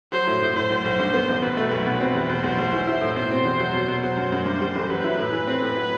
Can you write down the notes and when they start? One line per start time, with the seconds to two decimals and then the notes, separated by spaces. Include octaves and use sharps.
0.12 F#3 C5
0.27 A2
0.42 A2
0.56 A2 C5
0.70 B1
0.85 B1
0.99 G2
1.14 B3
1.28 A1
1.42 B2 B4
1.57 A3
1.72 B1
1.86 B2
2.00 C4
2.15 E2
2.29 B2 C5
2.44 B1
2.58 B1
2.73 E3
2.87 E4
3.01 A2
3.16 B2 C5
3.31 C4
3.45 E2
3.59 F#3
3.74 B2
3.88 B2
4.03 F#3 C5
4.17 F#2
4.32 F#2
4.46 G2
4.60 G3
4.76 A1
4.90 F#3 B4
5.04 E4
5.18 A2
5.33 E3
5.47 C4
5.62 A2
5.77 F#3